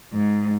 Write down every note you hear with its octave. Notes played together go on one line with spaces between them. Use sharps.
G#2